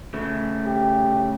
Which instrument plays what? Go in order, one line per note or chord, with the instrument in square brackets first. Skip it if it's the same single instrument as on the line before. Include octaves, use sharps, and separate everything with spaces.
[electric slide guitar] C#3 A3
[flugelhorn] G4